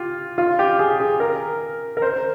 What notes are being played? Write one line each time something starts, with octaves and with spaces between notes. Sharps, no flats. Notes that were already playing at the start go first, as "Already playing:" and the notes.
Already playing: F4 G4
F4
G4
G#4
G#4
A#4
A#4
C5